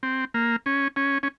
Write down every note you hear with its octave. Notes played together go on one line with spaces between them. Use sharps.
C4
A#3
C#4
C#4
C#4